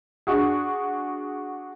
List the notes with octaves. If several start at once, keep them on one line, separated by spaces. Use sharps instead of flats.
D4 F#4 G#4